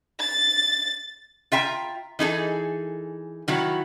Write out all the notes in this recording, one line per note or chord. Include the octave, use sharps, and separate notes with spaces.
A6
F4 E5 G5 A#5
E3 D#4 G#4 A4
D#3 F#3 E4